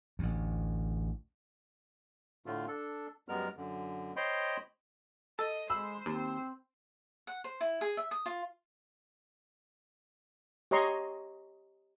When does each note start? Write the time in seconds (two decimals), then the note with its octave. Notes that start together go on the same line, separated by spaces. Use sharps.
0.19 A1 D2
2.46 A2 D3 A3 F4
2.68 D4 A4
3.28 F#2 G3 G#3 B3 A#4 F6
3.57 F#2 D3
4.16 C5 C#5 D#5 G5 B5 C6
5.39 A4 D#5
5.70 G#3 C5 B5 E6
6.06 D#2 C4
7.27 F#5
7.44 C5
7.61 E4
7.81 G#4
7.97 E5
8.11 D#6
8.26 F4
10.71 G4 C#5 D#5 A#5 C6 C#6